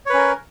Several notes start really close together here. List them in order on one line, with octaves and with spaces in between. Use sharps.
C#5 B4 C#4 A#4